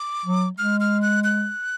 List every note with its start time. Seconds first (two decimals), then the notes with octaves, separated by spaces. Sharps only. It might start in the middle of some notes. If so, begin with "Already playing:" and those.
Already playing: D6
0.25 F#3
0.58 G#3 F6
0.80 F6
1.02 F#6
1.24 F#6